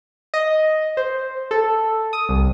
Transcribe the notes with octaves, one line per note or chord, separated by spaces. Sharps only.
D#5
C5
A4
D#6
C2